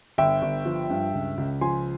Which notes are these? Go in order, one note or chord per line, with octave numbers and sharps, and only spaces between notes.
G1 E5 G5
G1
F3
G2
C#2
C#2
F3 G#5 C6